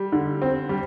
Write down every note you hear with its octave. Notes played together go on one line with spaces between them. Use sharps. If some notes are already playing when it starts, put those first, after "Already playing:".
Already playing: G3
D3
C4
G3